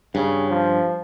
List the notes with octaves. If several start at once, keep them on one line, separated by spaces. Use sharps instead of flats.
G2 C#3
F3